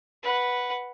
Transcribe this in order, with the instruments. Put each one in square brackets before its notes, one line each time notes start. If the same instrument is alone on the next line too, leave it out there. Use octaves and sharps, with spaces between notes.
[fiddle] B4 F#5